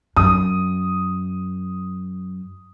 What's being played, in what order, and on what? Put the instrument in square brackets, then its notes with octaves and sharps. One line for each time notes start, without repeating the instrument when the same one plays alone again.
[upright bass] F#2 [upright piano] D#6